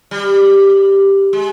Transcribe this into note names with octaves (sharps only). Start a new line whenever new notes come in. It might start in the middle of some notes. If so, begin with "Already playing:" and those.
G3
G#3